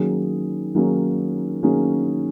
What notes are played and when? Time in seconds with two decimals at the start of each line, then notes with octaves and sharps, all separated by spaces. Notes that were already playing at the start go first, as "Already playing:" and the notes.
Already playing: D#3 F#3 A#3 C#4 G#4
0.75 D#3 F#3 A#3 C#4 G#4
1.63 D#3 F#3 A#3 C#4 G#4